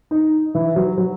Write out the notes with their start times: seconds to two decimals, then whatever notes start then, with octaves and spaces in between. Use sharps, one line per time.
0.11 D#4
0.55 E3
0.76 F#3
0.98 F#3